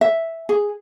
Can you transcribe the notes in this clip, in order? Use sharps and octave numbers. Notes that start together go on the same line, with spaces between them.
E5
G#4